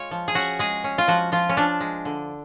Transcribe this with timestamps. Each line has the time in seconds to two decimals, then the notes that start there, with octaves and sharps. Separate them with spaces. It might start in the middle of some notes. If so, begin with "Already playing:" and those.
Already playing: G#3 F4 C#5
0.11 F3
0.28 G#4
0.35 C#4 F#4
0.59 G#3 G#4
0.84 C#4
0.98 F4
1.08 F3 F#4
1.32 F3 F4
1.49 C#4
1.57 F3 D4
1.81 G#3
2.05 D3